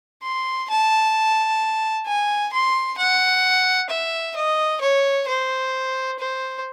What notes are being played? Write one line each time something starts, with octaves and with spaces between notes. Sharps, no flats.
C6
A5
G#5
C6
F#5
E5
D#5
C#5
C5
C5